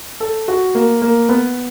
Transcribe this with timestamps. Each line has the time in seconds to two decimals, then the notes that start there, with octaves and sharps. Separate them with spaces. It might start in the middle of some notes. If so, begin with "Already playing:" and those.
0.20 A4
0.48 F#4
0.75 A#3
1.02 A#3
1.29 B3